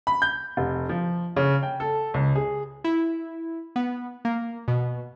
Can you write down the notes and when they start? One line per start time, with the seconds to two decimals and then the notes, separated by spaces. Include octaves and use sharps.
0.07 B5
0.22 G6
0.57 F1
0.89 F3
1.36 C#3
1.63 G5
1.80 A4
2.14 C#2
2.35 G#4
2.84 E4
3.76 B3
4.25 A#3
4.68 B2